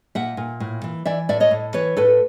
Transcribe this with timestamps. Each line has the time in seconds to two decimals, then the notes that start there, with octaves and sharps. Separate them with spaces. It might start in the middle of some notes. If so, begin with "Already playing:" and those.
0.15 A#2 E5 F#5
0.37 A#2
0.60 A2
0.84 E3
1.05 E3 D5 E5
1.29 A2 D5 E5
1.40 C#5 D#5
1.51 A2
1.74 E3 B4 C#5
1.97 A2 A4 B4